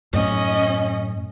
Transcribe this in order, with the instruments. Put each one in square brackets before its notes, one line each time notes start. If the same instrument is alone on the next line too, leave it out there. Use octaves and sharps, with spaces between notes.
[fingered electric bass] F#2 A2 [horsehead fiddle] C#4 D#5